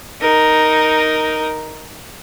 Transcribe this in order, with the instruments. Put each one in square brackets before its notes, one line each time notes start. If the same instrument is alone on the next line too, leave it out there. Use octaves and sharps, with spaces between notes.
[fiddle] D#4 A#4